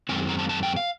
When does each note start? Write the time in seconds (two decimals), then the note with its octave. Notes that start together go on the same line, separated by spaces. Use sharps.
0.09 F#2 D#3 G#3 C4 G#5
0.29 A#5
0.39 A5
0.49 A5
0.63 G5
0.76 F5